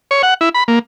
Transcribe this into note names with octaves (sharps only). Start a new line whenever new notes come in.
C#5
F#5
E4
B5
A#3